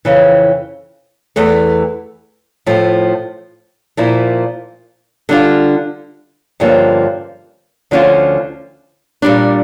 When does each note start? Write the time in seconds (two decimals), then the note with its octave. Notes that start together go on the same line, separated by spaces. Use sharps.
0.05 F2 C#3 E3
1.36 E2 E3 A3
2.66 A2 F3 A3
3.97 A#2 F3 A#3 E4
5.29 D3 G3 D4 F4
6.60 G2 D3 F3 A#3 C#4
7.91 D2 D3 F3 C#4 F4
9.22 A#2 G3 D4